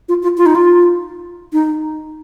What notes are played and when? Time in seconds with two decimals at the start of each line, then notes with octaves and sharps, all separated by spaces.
0.09 F4
0.23 F4
0.38 F4
0.46 D#4
0.55 F4
1.53 D#4